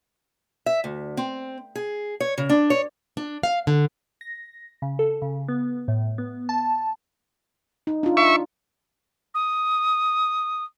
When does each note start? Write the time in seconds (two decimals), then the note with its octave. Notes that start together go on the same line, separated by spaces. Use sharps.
0.66 E5
0.84 D2
1.17 C4
1.76 G#4
2.20 C#5
2.38 C#3
2.49 D4
2.70 C#5
3.17 D4
3.43 F5
3.67 D3
4.21 A#6
4.82 C#3
4.99 A4
5.22 C#3
5.48 B3
5.88 A2
6.18 B3
6.49 A5
7.87 D#4
8.03 D4 F4
8.17 E5 C#6
9.34 D#6